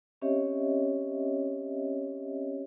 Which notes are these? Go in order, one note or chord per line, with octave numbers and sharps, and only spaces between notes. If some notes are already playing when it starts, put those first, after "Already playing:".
C4 C#4 G4 C#5 D#5 E5